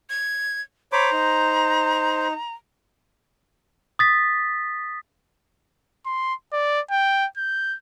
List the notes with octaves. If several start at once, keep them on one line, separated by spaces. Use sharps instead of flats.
G#6
C5 C#5 A#5 B5 D6
D#4
D#6 A6 B6
C6
D5
G5
G6